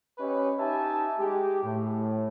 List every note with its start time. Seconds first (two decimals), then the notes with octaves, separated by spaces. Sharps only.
0.19 C#4 G4 B4 C#5 D#5
0.58 D#4 G4 E5 G#5 A5
1.19 G#3 G4
1.63 A2